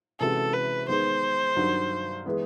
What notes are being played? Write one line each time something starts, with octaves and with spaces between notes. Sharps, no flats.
C3 E3 G#3 C#4 F#4 A4
B4
D#3 G#3 B3 C5
G2 D#3 F#3
E3 G#3 B3